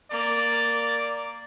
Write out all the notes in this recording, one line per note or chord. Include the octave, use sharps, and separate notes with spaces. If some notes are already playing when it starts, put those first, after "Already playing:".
A#3 D5